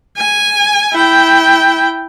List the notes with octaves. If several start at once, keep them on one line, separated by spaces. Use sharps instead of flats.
G#5
E4 G5